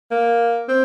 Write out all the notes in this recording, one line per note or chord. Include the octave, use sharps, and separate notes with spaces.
A#3
C4